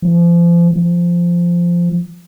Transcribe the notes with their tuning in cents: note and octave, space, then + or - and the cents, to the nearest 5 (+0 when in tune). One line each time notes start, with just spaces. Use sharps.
F3 -35
F3 -10